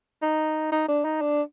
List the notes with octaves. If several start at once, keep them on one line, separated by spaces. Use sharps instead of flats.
D#4
D#4
D4
D#4
D4